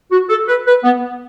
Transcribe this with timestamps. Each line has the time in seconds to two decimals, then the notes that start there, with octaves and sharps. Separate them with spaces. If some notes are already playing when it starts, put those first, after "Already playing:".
0.12 F#4
0.29 A4
0.48 B4
0.67 B4
0.84 B3